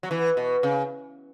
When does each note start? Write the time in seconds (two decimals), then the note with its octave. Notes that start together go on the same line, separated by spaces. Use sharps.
0.03 F#3
0.11 E3
0.37 B2
0.63 C#3